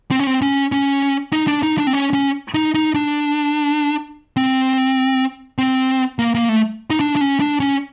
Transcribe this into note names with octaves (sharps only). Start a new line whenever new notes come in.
C4
C#4
C4
C#4
C#4
D#4
D4
D#4
D4
C4
C#4
C#4
D#4
D#4
D4
C4
C4
A#3
A#3
A3
D#4
D4
D4
C#4
D4
C#4